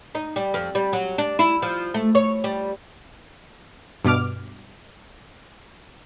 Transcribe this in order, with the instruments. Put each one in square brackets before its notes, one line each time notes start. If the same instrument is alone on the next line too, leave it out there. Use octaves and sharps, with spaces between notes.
[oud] D#4
G3
F2
G3
F#3
D4
E4
F3
A3
C#5
G3
[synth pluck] G2 B2 D6 F6